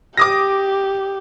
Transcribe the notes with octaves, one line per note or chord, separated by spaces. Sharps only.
G4 D6 D#6 A#6